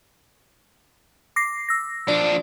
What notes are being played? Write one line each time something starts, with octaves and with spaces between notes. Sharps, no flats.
D6 A#6 C7
E6 A#6
F3 D4 D5